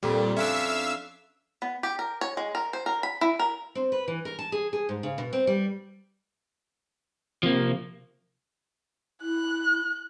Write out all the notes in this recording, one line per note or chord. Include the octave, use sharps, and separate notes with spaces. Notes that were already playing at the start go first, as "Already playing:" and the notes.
F2 A#2 G3
C#4 D4 E5 F5 E6
B3
G4
A#4
C#5
G#3
A#4
C5
A#4
B5
E4
A#4
C4
B4
E3
A#4
A5
G#4
G#4
G#2
C#3
B2
C4
G3
C3 F3 A#3
E4 F#6